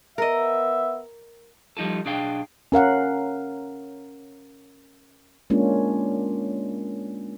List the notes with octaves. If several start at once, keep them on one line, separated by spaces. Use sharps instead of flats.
B3 A#4 D#5 E5
F3 G3 D#4 F4 A4
B1 D4 G#4 F5 G5
C#4 A#4 F5 F#5
G#3 A#3 C#4 D4 F4